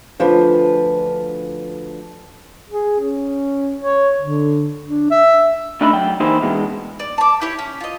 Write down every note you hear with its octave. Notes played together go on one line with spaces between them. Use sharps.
D2 F3 D4 B4
G#4
C#4
C#5
D3
D4
E5
C#3 A3 D4 D#4 E5 B5
F#3 G5
E3 A#3 D#4 E4 G4 C5
B2 E3 G#3
D5
A5 D6
E4 G4 C#5
C#4
F4 D#5